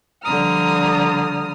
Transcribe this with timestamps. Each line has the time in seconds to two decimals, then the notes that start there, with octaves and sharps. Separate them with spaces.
0.24 D3 F3 G3 A#5 D#6 F6